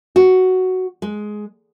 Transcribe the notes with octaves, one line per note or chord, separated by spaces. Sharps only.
F#4
G#3